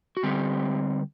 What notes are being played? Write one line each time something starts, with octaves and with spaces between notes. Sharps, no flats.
F#4
D3 G3 C4 G4